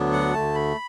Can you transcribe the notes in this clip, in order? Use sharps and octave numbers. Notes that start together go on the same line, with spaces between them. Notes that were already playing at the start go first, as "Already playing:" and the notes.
Already playing: D2 D3 F#3 B3 D4
F#5
D2 D3 A3 A5
B5